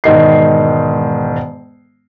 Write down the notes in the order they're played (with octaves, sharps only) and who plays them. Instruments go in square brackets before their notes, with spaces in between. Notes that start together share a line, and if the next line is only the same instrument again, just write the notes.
[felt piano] E1 G#2 D#3 C7